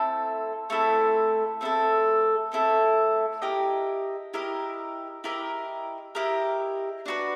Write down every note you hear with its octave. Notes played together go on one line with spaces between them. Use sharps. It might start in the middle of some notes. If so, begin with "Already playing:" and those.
Already playing: A3 C4 E4 A4
A3 C4 E4 A4
A3 C4 E4 A4
A3 C4 E4 A4
E4 G4 A#4 D#5
E4 G4 A#4 D#5
E4 G4 A#4 D#5
E4 G4 A#4 D#5
D4 F#4 B4